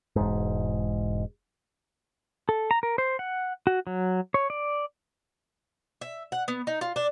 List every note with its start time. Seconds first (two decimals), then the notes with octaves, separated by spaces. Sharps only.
0.16 E1 G#2
2.49 A4
2.71 A#5
2.83 A#4
2.98 C5
3.19 F#5
3.67 F#4
3.87 F#3
4.34 C#5
4.50 D5
6.01 E5
6.32 F#5
6.48 B3
6.67 D#4
6.81 F4
6.96 D4